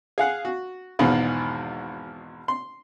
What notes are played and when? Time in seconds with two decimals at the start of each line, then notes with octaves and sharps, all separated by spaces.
0.18 G#4 F5 F#5
0.45 F#4
0.99 G#1 E2 G#2 B2 F4 G#4
2.48 C6